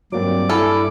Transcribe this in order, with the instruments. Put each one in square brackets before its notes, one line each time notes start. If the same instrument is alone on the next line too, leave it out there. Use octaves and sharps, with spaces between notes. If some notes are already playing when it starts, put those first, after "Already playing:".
[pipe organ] G2 D5 D6 [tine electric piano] F#3 A#3 C4
[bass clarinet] E4 [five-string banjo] A4 [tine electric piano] G#5 F6